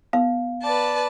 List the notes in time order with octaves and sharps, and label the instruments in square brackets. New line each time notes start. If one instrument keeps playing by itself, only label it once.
[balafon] B3 [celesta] F5
[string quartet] B4 A5 [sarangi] D5